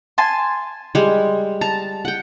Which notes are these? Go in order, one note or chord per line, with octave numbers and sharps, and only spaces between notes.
G#5 A5 C6
G3 G#3
A5 A#5
F#5 G5